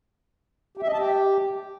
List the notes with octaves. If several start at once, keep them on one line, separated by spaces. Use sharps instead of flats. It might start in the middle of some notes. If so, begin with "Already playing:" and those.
G4
E5
D#5
A5
G4